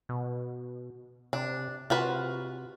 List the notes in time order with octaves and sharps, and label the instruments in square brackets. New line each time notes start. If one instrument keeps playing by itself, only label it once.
[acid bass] B2
[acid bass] C3 [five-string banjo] D4
[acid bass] C3 [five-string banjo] F4 F#4 B4